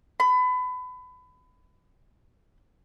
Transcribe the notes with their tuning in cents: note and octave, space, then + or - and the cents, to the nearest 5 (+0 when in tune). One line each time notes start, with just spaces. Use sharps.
B5 +30